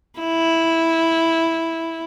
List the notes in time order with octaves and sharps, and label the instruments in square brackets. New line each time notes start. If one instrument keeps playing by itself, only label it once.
[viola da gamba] E4